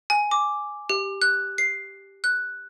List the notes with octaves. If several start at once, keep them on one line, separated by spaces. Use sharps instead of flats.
G#5
D6
G4
F#6
C7
F#6